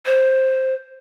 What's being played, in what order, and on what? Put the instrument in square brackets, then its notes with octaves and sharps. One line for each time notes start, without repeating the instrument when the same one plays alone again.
[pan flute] C5